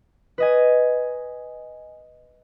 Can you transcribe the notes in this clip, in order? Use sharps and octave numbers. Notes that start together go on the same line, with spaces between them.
B4 D#5 G#5